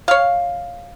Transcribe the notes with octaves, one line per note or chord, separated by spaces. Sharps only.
C#5 F5